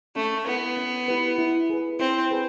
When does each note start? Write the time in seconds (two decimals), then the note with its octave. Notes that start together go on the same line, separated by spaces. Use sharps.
0.16 A3 C#4
0.47 B3 E4 G4 B4
0.77 C#4
1.08 E4 G4 B4
1.38 E4
1.70 G#4 B4
2.00 C4 E4
2.31 G#4 B4